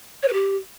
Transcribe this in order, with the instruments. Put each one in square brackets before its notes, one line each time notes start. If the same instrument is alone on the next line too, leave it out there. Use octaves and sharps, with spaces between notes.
[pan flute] C#5
B4
G4